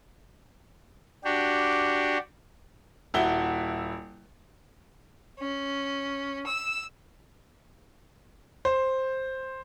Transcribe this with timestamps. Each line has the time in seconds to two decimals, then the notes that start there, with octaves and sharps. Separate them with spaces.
1.24 D4 F#4 G4
3.14 D#1 E4 F#4 G7
5.39 C#4
6.44 E6
8.65 C5